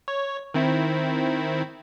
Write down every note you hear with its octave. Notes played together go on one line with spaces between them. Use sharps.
C#5
D#3 C4 E4